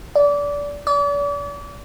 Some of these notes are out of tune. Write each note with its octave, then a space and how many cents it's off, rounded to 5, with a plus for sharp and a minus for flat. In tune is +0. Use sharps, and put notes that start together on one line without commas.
D5 -25
D5 -40